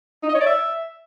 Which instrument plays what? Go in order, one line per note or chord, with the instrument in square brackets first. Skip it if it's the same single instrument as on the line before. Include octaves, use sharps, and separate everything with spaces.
[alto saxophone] D#4
D#5
C#5
D5
E5